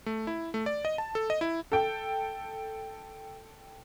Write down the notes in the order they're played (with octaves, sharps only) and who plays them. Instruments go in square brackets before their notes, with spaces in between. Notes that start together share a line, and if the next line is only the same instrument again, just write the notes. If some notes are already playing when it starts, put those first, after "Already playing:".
[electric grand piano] A3
E4
A3
D5
D#5
A5
A4
D#5
E4
[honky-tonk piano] A4 G5